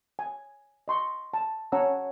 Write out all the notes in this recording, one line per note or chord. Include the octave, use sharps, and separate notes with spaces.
G#5
D#5 C6 C#6
A5
C#4 C#5 F#5 A5 A#5 E6